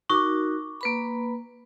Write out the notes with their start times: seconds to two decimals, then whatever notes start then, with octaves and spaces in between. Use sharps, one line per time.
0.10 D#4 F#4 A#4 C#6 D6
0.81 A#3 B4 B5